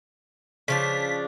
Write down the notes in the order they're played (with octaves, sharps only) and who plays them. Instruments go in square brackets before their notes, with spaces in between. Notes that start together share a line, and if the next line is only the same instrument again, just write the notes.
[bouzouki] C#3 F3 D4 [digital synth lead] B6